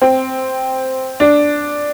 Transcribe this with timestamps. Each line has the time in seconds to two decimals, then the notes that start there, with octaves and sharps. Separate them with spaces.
0.02 C4
1.20 D4